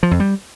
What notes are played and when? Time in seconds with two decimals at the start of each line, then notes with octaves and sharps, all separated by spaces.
0.03 F3
0.11 F2
0.20 G3